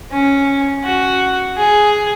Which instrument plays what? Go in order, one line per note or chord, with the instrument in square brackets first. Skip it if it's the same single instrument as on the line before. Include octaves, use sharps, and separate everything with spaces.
[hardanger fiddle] C#4
F#4
G#4